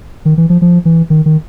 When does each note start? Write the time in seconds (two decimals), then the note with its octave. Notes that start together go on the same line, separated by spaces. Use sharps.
0.25 D#3
0.38 E3
0.50 F3
0.62 F3
0.85 E3
1.10 D#3
1.26 D#3